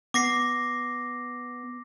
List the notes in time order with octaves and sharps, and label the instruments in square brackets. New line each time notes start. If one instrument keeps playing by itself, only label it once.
[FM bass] B3 [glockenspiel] D6 A#6 C7